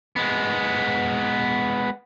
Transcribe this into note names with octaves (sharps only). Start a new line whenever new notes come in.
G#3 B3